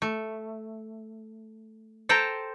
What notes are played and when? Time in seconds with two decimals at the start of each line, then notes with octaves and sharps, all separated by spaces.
0.02 A3
2.09 A4 C5 G5 A5 A#5